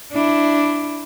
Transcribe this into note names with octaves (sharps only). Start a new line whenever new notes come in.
D4 E4